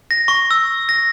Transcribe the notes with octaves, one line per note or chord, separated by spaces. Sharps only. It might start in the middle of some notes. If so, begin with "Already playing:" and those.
A#6
C#6
E6
A#6